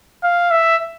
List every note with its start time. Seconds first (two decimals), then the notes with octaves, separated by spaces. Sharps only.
0.23 F5
0.51 E5